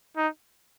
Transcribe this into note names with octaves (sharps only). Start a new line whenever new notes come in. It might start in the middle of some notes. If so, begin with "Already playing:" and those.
D#4